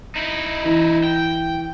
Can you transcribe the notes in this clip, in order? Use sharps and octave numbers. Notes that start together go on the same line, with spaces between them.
D#4 E4
E3
G5